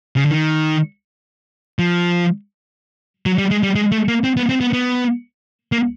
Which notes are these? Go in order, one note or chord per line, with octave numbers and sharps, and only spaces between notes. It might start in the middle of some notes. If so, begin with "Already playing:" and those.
C#3
D3
D#3
F3
F#3
G3
G#3
G3
G#3
A3
A#3
C4
B3
C4
B3
B3
A#3